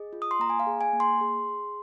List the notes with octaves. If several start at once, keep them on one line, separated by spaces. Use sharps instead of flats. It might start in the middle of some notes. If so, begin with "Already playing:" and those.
Already playing: G#4 D#5
F4
D#6
C6
A#3 A#5
G#5
F5
G#4
G#5
A#3
C6
G#4
G#4